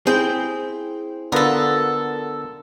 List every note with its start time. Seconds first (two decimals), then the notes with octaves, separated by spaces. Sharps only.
0.07 C4 E4 G#4 G5
1.32 D3 B3 F4 A4 A#4